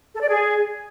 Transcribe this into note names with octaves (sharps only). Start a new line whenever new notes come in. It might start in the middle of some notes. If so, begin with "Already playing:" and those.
A4
D5
G#4